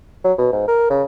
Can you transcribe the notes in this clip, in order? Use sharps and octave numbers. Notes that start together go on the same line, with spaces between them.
F#3
B2
G#2
A#4
C#3